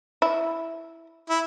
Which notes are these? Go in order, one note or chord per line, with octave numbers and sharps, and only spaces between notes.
E4
E4